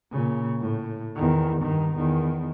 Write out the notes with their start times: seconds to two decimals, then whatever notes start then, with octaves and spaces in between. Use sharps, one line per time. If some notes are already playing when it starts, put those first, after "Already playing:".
0.12 A#2 C#3
0.61 A2
1.16 E2 D#3
1.62 G2 D#3
1.96 E2 D#3